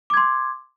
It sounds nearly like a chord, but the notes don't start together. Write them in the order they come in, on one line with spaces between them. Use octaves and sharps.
D6 G#6 C6